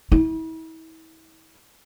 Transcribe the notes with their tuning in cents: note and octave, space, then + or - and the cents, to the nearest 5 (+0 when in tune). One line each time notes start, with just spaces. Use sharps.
E4 -40